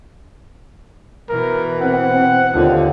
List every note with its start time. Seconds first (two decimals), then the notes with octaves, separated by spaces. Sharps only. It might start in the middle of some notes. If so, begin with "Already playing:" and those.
1.29 B2 E3 A#4
1.81 C4 F#5
2.12 C4
2.53 D#2 D3 F4